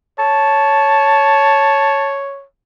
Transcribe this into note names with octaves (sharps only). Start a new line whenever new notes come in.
C#5 A5